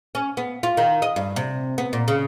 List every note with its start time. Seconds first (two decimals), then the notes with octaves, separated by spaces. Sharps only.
0.15 C#4
0.37 B3
0.63 F4
0.77 D#3
1.02 D#5
1.16 G2
1.36 C3
1.78 B3
1.93 A#2
2.08 C#3